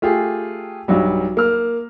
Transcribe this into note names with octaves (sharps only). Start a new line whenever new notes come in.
A3 F4 G4 G#4
B1 G2 F#3 G3
A#3 F6